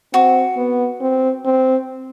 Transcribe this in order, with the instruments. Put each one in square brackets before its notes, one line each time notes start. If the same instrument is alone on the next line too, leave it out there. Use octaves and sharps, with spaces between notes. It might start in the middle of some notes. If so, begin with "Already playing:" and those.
[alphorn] C4 [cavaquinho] F#4
[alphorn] B3
C4
C4